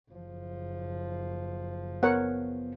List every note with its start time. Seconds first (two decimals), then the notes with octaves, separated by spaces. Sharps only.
0.11 F#1 F3
2.03 B3 A#4 C#5 F#5